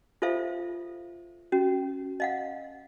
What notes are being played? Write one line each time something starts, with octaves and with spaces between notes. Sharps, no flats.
F4 A4 C5 E5 F5
C#4 F#4
D#5 F5 F#5